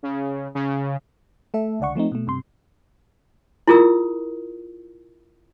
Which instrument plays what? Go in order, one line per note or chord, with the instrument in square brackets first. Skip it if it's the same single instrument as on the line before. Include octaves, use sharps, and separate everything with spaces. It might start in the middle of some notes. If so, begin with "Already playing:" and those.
[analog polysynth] C#3
C#3
[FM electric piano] A3 A4 E5
C#2 D3 D5 F#5 C#6
F3 A3 C4 D#4
B2 A3
G2 C3 C6
[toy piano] E4 F4 G#4 A#4 D#6 E6